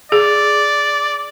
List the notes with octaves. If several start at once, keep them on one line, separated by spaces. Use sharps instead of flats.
G#4 D5